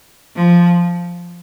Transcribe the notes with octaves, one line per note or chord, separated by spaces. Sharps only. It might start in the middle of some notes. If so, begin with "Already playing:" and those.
F3